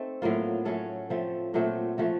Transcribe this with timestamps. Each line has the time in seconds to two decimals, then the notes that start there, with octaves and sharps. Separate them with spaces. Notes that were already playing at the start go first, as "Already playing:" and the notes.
Already playing: A3 C4 D#4 A4
0.22 A2 F#3 A#3 F4
0.65 F#3 A3 C#4 A4
1.10 F3 A3 C4
1.54 A#2 F#3 A3 C4
1.98 F3 A3 C#4 F#4